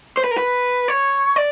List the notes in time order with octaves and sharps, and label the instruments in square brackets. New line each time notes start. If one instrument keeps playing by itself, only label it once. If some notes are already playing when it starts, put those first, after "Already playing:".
[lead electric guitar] C5
B4
A#4
B4
C#5
D5